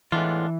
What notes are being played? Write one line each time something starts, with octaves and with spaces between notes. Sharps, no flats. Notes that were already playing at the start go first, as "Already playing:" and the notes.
A2 E3 G#3 B3 D4 F4